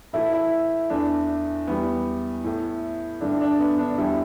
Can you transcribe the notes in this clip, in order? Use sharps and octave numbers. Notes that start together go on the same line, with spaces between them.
A2 E3 A3 E4
E4
E2 E3 A3 D4
E2 E3 G3 B3
A2 A3
G2 D3 A3 D4
D4
B3
D4
E2 D3 G3 E4